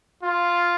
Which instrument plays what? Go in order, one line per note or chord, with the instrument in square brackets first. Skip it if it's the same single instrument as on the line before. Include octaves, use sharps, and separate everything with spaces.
[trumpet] F4